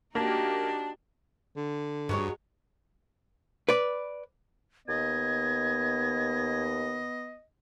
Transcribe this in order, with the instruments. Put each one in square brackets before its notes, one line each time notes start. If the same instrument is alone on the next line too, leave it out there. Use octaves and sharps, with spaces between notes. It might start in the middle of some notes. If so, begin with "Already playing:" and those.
[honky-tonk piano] A#3 [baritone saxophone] D4 [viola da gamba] D#4 F#4 G4
[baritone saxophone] D3
[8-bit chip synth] G2 [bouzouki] F#3 G#3 C#5
[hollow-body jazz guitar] B4 D5
[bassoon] D#2 [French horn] B3 [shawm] D#5 [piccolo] G#6